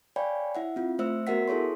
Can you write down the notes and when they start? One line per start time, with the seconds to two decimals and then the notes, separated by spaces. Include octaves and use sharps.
0.16 C#5 D5 F5 G5 G#5 B5
0.55 E4 E5 F#5
0.76 C4 F4
0.99 A3 C5 E5 E6
1.27 B3 F#4 A#4 E5 F#5 B6
1.48 E4 G#4 A4 C#5 C6